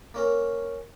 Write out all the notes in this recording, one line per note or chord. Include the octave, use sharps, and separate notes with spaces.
A#3 C#4 A#4